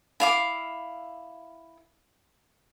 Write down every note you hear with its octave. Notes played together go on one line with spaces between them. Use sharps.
E4 F5 D6